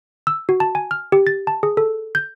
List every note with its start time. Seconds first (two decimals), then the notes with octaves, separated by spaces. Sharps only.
0.27 E6
0.49 F#4
0.60 A5
0.75 G#5
0.91 F6
1.12 G4
1.27 A6
1.47 A5
1.63 G#4
1.77 A4
2.15 G6